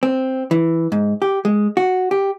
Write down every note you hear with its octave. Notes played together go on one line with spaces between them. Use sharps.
C4
E3
G#2
G4
G#3
F#4
G4